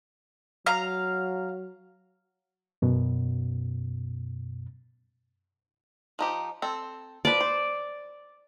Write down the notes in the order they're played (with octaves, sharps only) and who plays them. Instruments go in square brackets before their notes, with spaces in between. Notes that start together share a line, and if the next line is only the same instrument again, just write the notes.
[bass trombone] F#3 [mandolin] F5 A#5
[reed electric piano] F#2 B2
[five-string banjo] F3 D#4 G4
C4 A4
[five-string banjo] F3 B4 [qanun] D5
[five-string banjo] C5